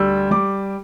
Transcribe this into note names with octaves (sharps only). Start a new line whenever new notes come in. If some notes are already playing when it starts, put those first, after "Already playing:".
Already playing: D2 G3 E6
G3 D6